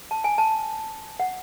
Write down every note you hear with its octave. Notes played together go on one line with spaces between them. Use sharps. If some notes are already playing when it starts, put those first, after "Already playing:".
A5
G#5
A5
F#5